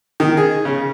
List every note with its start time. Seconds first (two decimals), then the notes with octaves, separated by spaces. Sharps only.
0.20 D#3
0.37 G#4
0.65 C#3